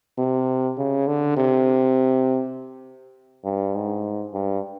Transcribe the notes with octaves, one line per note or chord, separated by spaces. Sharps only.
C3
C#3
D3
C3
G2
G#2
G2